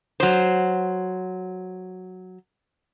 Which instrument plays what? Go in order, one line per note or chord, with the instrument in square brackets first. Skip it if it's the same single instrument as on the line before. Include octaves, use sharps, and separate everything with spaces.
[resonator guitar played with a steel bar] F#3 C5